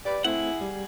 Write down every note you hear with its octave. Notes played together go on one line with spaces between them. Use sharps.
G4 B4 D5 B5
A3 C4 E4 G#4 F#5
G3